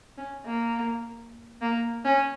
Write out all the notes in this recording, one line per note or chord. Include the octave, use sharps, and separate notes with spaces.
C#4
A#3
A#3
C#4